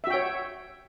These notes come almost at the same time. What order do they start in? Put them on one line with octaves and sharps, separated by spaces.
E5 F#4 G5 C#5